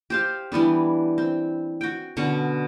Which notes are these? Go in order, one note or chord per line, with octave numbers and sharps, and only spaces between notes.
G4 C5 F5
E3 G3 B3 D4
C4
F#4 G5
B2 D3 C#4 C#6